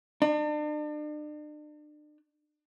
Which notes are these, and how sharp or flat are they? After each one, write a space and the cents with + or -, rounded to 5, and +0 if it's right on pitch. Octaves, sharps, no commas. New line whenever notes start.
D4 +40